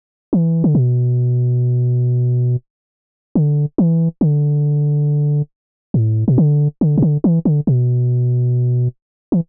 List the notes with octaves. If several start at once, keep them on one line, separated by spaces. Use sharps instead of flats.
E3
D3
B2
D3
E3
D3
A2
B2
D3
D3
B2
D3
E3
D3
B2
E3